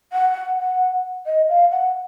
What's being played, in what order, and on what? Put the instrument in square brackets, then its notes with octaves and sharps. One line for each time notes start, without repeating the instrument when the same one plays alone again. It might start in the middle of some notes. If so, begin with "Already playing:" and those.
[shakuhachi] F#5
F#5
D#5
F5
F#5